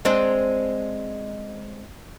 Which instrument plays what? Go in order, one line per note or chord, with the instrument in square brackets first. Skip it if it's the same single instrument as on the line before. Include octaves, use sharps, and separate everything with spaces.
[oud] G#3 C4 D4